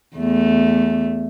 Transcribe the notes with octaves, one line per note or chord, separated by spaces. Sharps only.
E2 A3